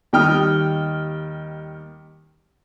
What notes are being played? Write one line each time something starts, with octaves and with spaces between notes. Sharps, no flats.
D#2 D#3 G3 G5 D#6 F6